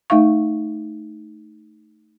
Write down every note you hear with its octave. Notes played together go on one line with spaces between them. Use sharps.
A3 D#4 E5 F5 C#6